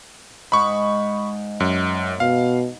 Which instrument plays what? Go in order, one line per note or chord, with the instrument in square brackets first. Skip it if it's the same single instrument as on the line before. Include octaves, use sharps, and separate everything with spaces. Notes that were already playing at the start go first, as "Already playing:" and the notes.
[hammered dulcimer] G#2 [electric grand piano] B5 C#6
[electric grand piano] F#2
[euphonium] B2 [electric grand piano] F5